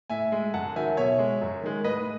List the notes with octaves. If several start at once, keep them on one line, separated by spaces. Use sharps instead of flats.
A2 E5 G#5
G#3
F#2 F#5 A5
D#3 F#3 E5 G#5
B2 C#5 E5
G#3
F#2
D#3 G#3
A2 B4 D#5